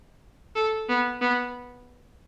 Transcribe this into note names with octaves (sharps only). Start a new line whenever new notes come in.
A4
B3
B3